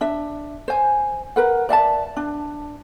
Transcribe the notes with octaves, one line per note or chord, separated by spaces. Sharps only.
D4 E5
C5 G#5
A#4 B4 F#5
D5 E5 F#5 A5
D4